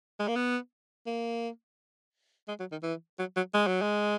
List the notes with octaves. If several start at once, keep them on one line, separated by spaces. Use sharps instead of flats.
G#3
A#3
B3
A#3
G#3
F#3
D#3
E3
F#3
F#3
G#3
F#3
G#3